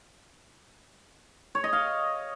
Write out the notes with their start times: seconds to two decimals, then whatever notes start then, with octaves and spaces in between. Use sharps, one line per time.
1.55 C#5
1.64 D#5
1.73 F5